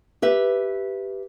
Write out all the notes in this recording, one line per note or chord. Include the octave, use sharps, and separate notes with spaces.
G4 B4 E5